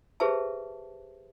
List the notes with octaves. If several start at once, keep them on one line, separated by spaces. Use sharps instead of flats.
G4 G#4 B4 C5 E5 A5